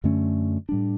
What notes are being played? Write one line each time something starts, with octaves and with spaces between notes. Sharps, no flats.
F#2 D3 A3 C#4
A2 G3 D4